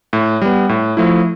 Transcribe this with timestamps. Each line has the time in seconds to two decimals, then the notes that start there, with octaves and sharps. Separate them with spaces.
0.13 A2
0.42 G3 B3
0.69 A2
0.97 F3 A3 E4